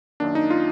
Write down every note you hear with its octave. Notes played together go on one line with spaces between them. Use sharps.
F#2 D#3 A#3 D4
D#4
F4